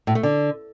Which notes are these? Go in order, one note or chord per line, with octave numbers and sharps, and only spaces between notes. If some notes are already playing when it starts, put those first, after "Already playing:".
A2
A3
D3